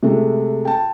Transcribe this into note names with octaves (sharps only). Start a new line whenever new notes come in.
C3 G#3 A3
G5 A5